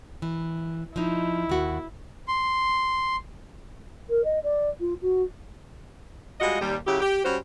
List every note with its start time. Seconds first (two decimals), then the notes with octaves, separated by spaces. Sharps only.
0.22 E3
0.96 F3 D#4 E4
1.49 D#2 F#4
2.28 C6
4.09 A#4
4.24 D#5
4.43 D5
4.80 F4
5.01 F#4
6.40 G3 G#3 F4 F#4 D#5
6.60 D#2 G3
6.87 C#3 F#3 E4 G4
7.01 G4
7.24 G3 C#4 F#4 C5